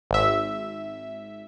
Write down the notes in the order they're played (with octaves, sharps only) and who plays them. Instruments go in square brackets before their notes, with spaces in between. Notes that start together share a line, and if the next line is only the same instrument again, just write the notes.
[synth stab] G#1 E5